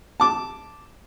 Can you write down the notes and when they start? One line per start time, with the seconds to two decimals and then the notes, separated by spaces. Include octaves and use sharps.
0.20 A5 D6